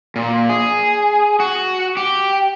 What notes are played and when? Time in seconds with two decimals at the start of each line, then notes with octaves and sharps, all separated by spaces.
0.16 A#2
0.49 G#4
1.40 F#4
1.97 G4